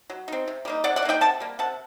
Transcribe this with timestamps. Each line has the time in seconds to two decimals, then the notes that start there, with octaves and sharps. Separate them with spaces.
0.10 F#3
0.28 C4 D#4
0.48 C3
0.65 G3 A#3 D#4
0.84 C3 D5 F#5
0.96 D5 F#5
1.02 G3
1.05 A#3 D#4 D#5 G5
1.21 C3 F#5 A5
1.40 G3 A#3
1.59 C3 F#5 A5